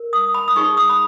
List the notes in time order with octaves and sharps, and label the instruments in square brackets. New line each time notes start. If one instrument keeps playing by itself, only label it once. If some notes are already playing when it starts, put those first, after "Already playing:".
Already playing: [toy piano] A#4
D#6
B5
D#6
D#4 G#4 C#5 C#6
D#6
B5